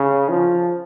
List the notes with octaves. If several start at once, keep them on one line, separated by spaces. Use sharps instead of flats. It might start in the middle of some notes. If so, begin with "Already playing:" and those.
Already playing: C#3
F3